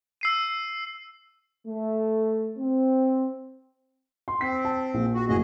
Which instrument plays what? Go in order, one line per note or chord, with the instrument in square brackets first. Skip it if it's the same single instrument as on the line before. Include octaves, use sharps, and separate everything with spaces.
[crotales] E6 C7 D#7
[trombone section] A3
C4
[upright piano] C6
[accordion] C4 [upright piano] B6 C7
[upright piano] A5
A#1
[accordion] F#4
[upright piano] F#1 A2 [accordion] F#4 G#4 D#5